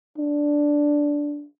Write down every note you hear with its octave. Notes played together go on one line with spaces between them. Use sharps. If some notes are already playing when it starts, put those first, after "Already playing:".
D4